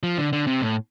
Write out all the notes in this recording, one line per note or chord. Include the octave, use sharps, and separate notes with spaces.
F3
D3
D3
C3
A2